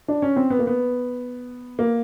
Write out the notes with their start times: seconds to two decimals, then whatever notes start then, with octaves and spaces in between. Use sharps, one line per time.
0.08 D4
0.22 C#4
0.36 C4
0.50 B3
0.59 A#3
0.67 B3
1.79 A#3